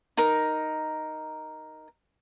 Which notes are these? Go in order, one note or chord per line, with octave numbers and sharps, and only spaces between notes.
D#4 A#4